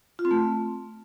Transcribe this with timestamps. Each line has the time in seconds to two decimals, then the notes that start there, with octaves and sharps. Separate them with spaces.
0.19 F4
0.25 C4
0.31 A3